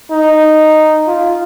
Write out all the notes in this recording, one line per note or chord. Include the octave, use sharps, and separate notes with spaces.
D#4
F4